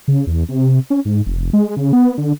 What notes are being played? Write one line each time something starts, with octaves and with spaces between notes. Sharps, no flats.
C#3
E2
C3
C#4
G#2
F1
G#3
C#3
B3
D3